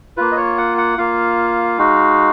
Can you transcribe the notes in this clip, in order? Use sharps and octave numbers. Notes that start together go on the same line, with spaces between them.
A#3 F4 B4
D#5
C#5
F#5
F#5
A#3 F4 F5
G#3 D#4 F#4